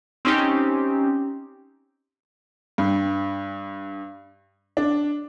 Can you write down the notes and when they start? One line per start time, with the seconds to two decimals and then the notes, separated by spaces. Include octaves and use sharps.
0.25 C4 C#4 D#4 G4
2.78 G2
4.77 D4